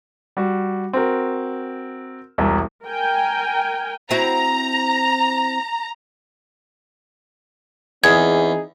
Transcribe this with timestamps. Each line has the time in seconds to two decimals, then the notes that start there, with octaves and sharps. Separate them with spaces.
0.37 G3 F#4
0.93 C4 F#4 A#4
2.38 E1 C2 E4 E5 A#5
2.84 A#4 G5 G#5
4.11 C4 E4 F#4 A#5
8.04 E2 C4 D#4 G#4 G#6